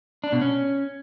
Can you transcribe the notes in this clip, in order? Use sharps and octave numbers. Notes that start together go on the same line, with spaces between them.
D4
B2
C#4